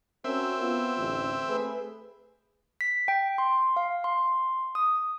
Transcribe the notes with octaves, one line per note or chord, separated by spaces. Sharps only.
C4 C#4 F#4 A#4 E5
B3 F4
A1 D2
A3 G#4 B4
B6
G5
C6
F5
C6
D#6